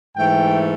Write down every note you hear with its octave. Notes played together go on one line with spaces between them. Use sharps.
G#2 E3 A3 G5